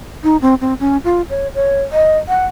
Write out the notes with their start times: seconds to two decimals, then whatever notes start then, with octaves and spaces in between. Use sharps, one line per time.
0.24 D#4
0.41 C4
0.61 C4
0.80 C#4
1.04 F4
1.30 C#5
1.55 C#5
1.92 D#5
2.28 F#5